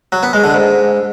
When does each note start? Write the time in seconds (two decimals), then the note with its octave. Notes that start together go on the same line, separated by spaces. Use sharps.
0.12 F#3
0.23 B3
0.33 G#3
0.44 D3
0.54 G#2